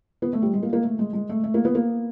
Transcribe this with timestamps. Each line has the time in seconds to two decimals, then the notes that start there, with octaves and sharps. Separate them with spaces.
0.22 B3
0.33 A3
0.42 G3
0.53 G#3
0.63 A#3
0.73 A#3
0.83 A3
0.99 G#3
1.13 G#3
1.29 A3
1.44 A3
1.54 A#3
1.65 B3
1.75 A#3